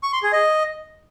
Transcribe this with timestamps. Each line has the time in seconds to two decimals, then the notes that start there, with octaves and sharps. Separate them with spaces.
0.03 C#6
0.13 C6
0.23 G#4
0.33 D#5